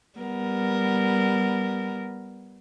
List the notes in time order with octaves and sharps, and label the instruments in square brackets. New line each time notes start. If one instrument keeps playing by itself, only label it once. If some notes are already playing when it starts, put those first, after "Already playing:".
[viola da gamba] G3 B3 A#4